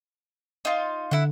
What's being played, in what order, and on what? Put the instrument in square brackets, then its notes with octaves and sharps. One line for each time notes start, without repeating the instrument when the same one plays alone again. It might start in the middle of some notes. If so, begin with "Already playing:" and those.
[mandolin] D#4 F4
[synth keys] D3 [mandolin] E4 F#5